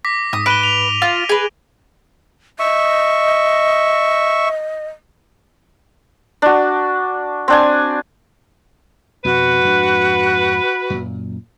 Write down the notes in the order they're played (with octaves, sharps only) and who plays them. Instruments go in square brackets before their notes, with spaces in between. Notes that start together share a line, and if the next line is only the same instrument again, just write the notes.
[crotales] D6 A#6 B6
[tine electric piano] G#2 [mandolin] D#6
[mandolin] B4 [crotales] D7 D#7 G7
[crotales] F7
[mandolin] F4
G#4 B4
[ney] D#5 [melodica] E5 C#6
[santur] D4 F#4
C4 D4 G#5
[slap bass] F2 B2 [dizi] F#4 [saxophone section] B4
[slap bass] F2 G#2 D4
F#2 A#2